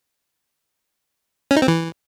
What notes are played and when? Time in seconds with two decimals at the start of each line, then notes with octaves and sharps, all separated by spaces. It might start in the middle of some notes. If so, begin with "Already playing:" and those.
1.51 C#4
1.57 D#4
1.62 C4
1.68 E3